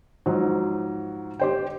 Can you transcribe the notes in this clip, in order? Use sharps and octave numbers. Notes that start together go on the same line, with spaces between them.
G#2 F3 F#3
G4 C5 G5